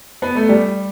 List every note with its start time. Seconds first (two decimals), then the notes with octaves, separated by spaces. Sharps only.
0.22 B3
0.36 A3
0.49 G3